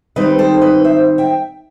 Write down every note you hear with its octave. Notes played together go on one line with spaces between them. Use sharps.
D#3 G3 C4 D#4 B4 D#5
A4 C5
B4 D#5
C5 E5
E5 G5